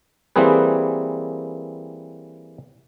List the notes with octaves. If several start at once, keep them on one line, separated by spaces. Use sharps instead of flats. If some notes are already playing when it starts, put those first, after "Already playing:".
E3 G3 A#3 C4 G#4 B4